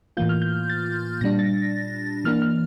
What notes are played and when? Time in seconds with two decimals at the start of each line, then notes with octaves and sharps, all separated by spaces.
0.17 A2 E3 A#3 F4 G6
0.29 F6
0.42 G6
0.70 A6
1.21 A#2 G3 D4 A#6
1.39 A6
2.24 E3 A#3 D4 F6
2.42 F6